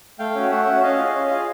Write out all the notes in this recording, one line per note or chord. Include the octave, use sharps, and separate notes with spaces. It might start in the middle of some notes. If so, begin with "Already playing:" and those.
A3 F5 G5
C#4 F#4
A3 E5 F#5
C#4 F#4
C#4 D#5 F5
F4 G#4
C#4
F4 G#4